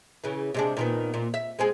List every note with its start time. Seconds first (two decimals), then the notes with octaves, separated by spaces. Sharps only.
0.24 C#3 E3
0.54 C3 G#3 D4
0.77 A#2 D#3 B3
1.14 A#2
1.34 E5
1.59 G#3 C4 G#4